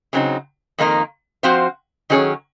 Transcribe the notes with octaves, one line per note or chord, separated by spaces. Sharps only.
C#3 F#3 C4 D#4
F2 D#3 A#3 D#4 A#4
F3 C4 F#4 C5 F5
D#3 F#3 C#4 G#4 C#5